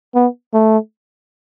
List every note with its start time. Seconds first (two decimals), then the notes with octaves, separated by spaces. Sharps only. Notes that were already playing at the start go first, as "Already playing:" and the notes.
0.14 B3
0.53 A3